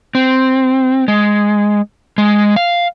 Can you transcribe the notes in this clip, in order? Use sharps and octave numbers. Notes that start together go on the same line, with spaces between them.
C4
G#3
G#3
F5